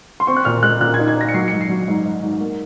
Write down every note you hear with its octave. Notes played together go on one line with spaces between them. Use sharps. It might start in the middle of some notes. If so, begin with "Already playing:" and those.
C6
C4 C#6
F#6
A#2 F6
G#3 F#6
A#2 F#6
G#6
D#4
G#6
D#4 A#6
C#7
F#3 C7
G#2 C#7
C7
F#3
G#2
G#2
G#2
A#3